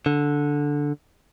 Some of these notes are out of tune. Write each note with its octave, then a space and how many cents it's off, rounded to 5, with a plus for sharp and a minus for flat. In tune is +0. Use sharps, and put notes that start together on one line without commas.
D3 -5